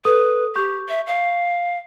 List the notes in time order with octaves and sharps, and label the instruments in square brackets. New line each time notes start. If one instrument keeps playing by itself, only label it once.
[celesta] A4 D#6 [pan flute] B4
[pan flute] G4 [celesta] C#6 G6
[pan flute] E5
F5